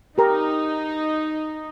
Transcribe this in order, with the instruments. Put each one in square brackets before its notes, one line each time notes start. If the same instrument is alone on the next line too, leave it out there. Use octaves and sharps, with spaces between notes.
[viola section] D#4 [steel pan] G4 A#4 A#5